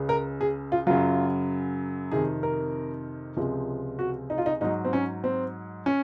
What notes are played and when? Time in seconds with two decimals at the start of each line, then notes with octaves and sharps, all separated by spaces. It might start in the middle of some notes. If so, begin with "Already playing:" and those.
Already playing: C#2 C#3 G#3
0.09 A#4
0.41 G#4
0.72 F4
0.87 F#2 C#3 F#3 F4
2.11 F2 C3 D#3 G#4
2.43 A#4
3.36 C#2 C3 F3 G#3
3.99 F#4
4.30 D#4
4.38 F4
4.46 D#4
4.61 G#2 F#3 D#4
4.85 C4
4.93 C#4
5.24 C4
5.86 C#4